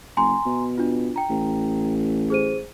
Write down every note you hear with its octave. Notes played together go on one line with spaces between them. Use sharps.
F#1 G#5 A#5 C6
B2
D4 F4
G5 A#5
A1
G#4 C5 D#7